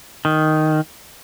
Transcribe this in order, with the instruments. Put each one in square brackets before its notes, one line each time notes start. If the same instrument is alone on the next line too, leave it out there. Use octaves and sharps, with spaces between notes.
[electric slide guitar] D#3